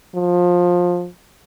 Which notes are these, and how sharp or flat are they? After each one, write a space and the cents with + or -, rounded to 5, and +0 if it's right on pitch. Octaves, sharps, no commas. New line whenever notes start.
F3 +20